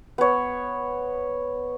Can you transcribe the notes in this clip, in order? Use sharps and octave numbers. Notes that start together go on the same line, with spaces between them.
B3 C#5